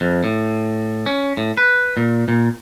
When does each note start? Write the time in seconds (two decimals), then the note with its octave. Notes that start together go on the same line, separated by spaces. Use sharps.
0.01 F2
0.24 A2
1.06 C#4
1.37 A2
1.57 B4
1.97 A#2
2.28 A#2